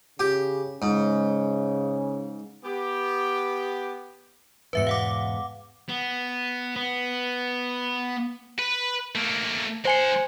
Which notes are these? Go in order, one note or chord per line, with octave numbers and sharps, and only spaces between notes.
C#3 G4
G#2 C#3
B3 G4
E2 G#2 B2 B4 E5 C#7
F5 F#5 D6
B3
B3
B4
A3 A#3
F#3 C5 G#5 C6 C#7